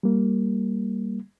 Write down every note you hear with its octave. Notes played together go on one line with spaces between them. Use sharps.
G3 A#3